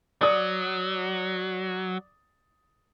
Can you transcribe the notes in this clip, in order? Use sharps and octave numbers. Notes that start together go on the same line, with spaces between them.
F#3 D5 D#6